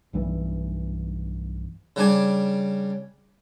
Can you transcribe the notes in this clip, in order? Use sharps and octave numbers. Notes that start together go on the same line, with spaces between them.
B1 G2 E3
C#3 G3 D4 G#5